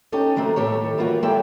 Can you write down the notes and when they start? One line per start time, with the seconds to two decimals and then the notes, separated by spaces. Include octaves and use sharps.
0.12 C#4 D#4 G4 A4 D#5
0.36 D#3 F#3 A3 C4
0.56 A2 D#3 G4 A4 C#5
0.98 E3 G3 A#3 F4 F#4
1.23 F#3 G#3 G4 A4 E5 G5